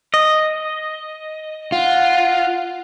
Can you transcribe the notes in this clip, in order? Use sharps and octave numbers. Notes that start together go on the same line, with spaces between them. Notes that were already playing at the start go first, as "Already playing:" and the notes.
D#5
F4 F#5